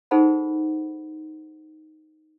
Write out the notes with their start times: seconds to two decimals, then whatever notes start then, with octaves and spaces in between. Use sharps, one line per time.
0.11 D#4 G#4 A4 C5 F#5 B5